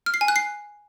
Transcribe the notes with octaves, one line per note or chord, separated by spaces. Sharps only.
F6
C7
G#5
F#6
C7